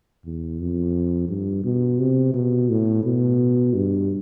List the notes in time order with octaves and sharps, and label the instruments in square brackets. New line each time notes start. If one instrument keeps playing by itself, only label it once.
[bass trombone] E2
F2
G2
B2
C3
B2
A2
B2
G2